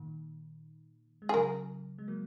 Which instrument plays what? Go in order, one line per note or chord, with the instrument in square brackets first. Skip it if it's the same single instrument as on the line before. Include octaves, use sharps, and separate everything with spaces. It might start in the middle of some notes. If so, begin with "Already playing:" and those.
Already playing: [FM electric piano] A#2 D#3
G#3
[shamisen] G#4
[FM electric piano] C#3 F#3 [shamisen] A#4
[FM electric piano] G#3
F#3 A#3